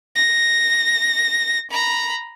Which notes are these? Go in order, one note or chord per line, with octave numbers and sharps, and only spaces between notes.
A#6
A#5 B5